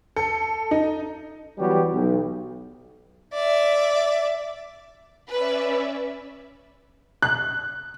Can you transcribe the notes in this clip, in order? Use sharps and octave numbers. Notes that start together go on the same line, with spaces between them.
A4
D#4
E3 F#3 G3 B3 F#4 G4
B1
D5 E5
C#4 B4 D5 E5
F#6